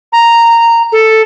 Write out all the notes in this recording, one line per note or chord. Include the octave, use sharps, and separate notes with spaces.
A#5
A4